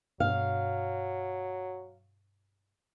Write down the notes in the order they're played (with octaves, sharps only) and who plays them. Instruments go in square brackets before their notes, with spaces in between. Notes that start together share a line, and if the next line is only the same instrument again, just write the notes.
[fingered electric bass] G2 B2 [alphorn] F#3 [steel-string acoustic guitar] F5